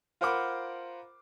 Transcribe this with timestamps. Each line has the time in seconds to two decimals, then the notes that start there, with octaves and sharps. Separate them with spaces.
0.21 F4 A#4 C5 F#5 B5 D6